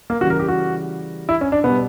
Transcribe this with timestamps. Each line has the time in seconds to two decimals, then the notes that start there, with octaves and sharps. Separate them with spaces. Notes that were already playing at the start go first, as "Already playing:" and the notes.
0.10 A#3
0.21 C#3 E3 G3 F#4
0.30 A#4
0.39 G4
0.48 F#4
1.29 E4
1.41 C#4
1.52 D4
1.64 B2 G3 B3